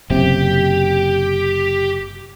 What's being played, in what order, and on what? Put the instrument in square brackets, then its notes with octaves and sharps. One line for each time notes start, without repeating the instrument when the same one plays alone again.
[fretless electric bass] F#1 C3 [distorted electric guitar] G4